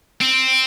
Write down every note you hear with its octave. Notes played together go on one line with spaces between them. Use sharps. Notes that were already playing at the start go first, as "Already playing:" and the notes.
C4